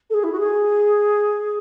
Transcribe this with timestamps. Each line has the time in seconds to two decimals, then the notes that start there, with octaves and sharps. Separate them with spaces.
0.10 A4
0.13 G#4
0.23 E4
0.32 F#4
0.39 G#4